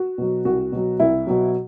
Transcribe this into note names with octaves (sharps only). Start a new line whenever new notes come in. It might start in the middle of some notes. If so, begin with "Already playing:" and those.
Already playing: F#4
B2 F#3
C2 F#4
B2 F#3
C2 E4
B2 F#3